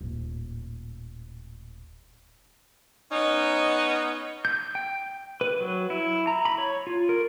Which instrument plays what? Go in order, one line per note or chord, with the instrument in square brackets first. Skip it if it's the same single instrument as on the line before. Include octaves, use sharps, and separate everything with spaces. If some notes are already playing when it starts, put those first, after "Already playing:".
[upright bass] D#1 A2
[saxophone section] B3 C#4 D#4
[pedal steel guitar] G6
G5
B4
F#3
E4
A#5
B5
C#5
F4
A#4